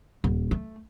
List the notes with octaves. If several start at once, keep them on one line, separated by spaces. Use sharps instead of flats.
D#1
A3